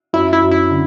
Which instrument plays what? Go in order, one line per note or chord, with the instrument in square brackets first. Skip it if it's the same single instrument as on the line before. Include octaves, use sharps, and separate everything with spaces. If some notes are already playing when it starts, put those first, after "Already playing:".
[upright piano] F#2 [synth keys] E4
[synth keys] E4
[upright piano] F#2
[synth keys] E4
[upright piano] D3